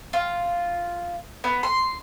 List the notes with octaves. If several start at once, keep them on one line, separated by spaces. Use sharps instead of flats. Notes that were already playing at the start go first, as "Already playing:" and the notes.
F4
B3
C6